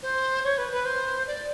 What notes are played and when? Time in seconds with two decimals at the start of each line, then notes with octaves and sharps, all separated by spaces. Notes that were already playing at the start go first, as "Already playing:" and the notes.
0.03 C5
0.44 C#5
0.58 B4
0.72 B4
0.86 C5
1.27 D5